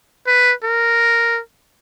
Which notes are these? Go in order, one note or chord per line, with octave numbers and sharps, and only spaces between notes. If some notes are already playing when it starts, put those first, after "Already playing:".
B4
A#4